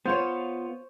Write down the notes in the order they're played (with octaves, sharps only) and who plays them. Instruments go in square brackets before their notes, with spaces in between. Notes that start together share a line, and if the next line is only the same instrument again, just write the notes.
[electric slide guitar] B3 F4 [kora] C5 C#5